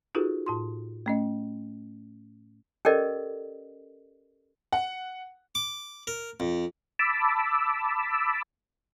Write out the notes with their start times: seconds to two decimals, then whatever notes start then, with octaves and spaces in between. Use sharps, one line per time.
0.15 D#4 F4 F#4 G#4 A4 B4
0.46 A2 F4 C6
1.06 A3 C#4 D#5
2.85 C#4 G4 A4 A#4 D5 D#5
4.72 F#5
5.55 D6
6.07 A#4
6.40 F2
6.99 A5 B5 D6 E6